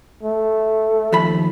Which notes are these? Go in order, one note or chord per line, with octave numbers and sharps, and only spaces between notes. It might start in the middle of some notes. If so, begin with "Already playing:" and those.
A3
D#2 F3 B5